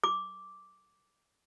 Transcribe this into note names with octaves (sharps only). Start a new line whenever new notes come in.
D6